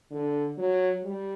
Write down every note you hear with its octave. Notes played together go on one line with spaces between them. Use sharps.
D3
F#3
G3